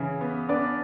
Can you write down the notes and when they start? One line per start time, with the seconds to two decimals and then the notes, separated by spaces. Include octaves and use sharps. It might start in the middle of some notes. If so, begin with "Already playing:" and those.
Already playing: C#3 E3 E4
0.21 B3
0.49 B3 D4 D5